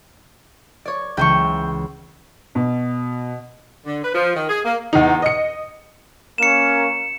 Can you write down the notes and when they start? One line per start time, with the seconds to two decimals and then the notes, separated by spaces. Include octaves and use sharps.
0.85 C#5 D5
1.17 C#2 E3 G5 G#5 C#6
2.55 B2
3.86 D3
4.03 B4
4.14 F3
4.35 D#3
4.49 G#4
4.65 A#3
4.93 E2 D#4
5.22 D#5 C#7
6.38 A#3 C#4 A#4 C#7 E7